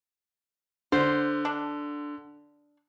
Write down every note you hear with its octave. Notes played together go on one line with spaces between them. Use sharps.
D3 C5
D4